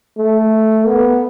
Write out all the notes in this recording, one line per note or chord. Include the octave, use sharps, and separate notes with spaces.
A3
B3